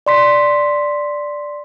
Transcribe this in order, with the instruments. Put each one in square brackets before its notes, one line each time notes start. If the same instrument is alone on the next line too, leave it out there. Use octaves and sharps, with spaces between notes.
[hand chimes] D5 C6 B6